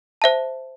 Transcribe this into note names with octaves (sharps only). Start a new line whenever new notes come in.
C5 E5 A5